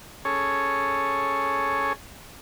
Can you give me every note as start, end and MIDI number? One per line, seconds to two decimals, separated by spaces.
0.25 1.93 61
0.25 1.93 68
0.25 1.93 69
0.25 1.93 73